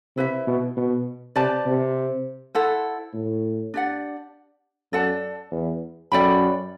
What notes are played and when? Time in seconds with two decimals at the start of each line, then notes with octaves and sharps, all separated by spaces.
0.16 C3 E4 B4 E5
0.47 B2
0.77 B2
1.36 C3 G4 B4 D5 A5
1.66 C3
2.55 E4 A4 C5 F#5
3.14 A2
3.74 D4 G4 D5 F#5
4.92 F#2 A4 D5 F#5 A5
5.52 E2
6.12 F#2 A4 D5 G5 B5